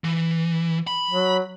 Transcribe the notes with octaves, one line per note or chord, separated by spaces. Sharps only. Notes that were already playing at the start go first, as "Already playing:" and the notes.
E3
B5
F#3